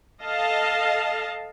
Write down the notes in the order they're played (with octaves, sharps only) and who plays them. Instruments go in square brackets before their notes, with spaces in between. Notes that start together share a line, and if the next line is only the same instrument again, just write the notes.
[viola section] A4 D#5 F5 A5